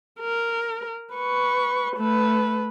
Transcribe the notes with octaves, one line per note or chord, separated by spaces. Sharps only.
A#4
B4 C#6
A3 B4